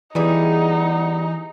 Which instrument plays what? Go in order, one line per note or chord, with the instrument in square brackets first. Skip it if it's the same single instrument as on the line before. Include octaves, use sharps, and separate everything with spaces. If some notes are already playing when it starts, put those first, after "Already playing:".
[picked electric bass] E3 [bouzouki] G3 B3 G#4 [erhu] D#4